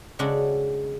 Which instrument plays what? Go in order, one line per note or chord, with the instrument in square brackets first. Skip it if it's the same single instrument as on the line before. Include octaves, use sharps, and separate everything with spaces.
[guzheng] C#3 G#3 D4 D#4 F#4 A4